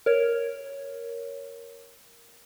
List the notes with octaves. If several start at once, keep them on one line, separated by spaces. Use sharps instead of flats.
A#4 C#5